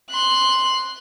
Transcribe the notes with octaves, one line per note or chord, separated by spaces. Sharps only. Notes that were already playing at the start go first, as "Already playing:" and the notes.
C6 F#6